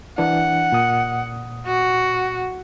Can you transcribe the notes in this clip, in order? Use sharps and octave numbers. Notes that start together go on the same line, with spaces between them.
E3 D4 F#5
A#2 D#6
F#4